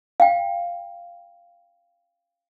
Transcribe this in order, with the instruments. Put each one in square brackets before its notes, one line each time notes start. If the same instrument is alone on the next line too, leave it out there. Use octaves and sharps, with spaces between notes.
[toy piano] F5 G5